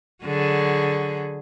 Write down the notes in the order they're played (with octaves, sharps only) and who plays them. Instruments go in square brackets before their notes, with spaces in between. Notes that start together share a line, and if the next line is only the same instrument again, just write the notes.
[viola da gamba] D3 F#3 G#4